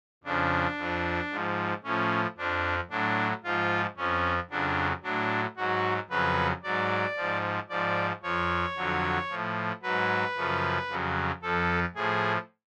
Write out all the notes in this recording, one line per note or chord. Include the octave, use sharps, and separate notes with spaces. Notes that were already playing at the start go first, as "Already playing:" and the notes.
F2 C#3 F3 D4
F2 F3
G#2 F3
A2 F3 C#4
F2 F3 D4
A2 F#3 D4
G#2 F3 F4
F2 F3 C#4
F2 C#3 F#3 D4
A2 F#3 D4
G#2 F#3 F#4
F2 C#3 F#3 B4
G#2 F#3 D5
G#2 F3
G#2 F3 D5
F2 F3 C#5
F2 D3 F#3
A2 F3
G#2 F#3 B4
F#2 C#3 F3
F2 C#3 F#3
F2 F3 A4
A2 F3 G#4